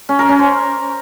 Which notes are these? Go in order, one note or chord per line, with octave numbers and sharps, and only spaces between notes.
C#4
A#4
C#4
C5